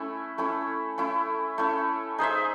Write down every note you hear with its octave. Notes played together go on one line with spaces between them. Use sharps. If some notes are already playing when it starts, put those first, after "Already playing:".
Already playing: A3 C#4 E4
A3 C#4 E4
A3 C#4 E4
A3 C#4 E4
D#4 G#4 C5 E5